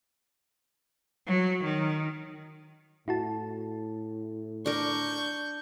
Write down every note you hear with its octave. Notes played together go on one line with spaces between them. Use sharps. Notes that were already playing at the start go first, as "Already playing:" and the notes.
F#3
D#3
A2 E4 F#4 A5
D4 A#4 C#6 G6